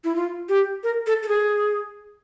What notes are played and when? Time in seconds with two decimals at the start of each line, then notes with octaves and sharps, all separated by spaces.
0.04 E4
0.16 F4
0.49 G4
0.83 A#4
1.07 A4
1.23 A4
1.28 G#4